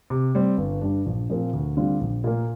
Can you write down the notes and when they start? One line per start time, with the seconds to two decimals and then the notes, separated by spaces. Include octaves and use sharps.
0.10 C3
0.35 G3 C4
0.58 G1
0.81 G2 G3 D4
1.06 A#1
1.29 A#2 F3 C4 A#4
1.53 D2
1.77 D3 G3 C4 F4
2.01 A#1
2.24 A#2 A#3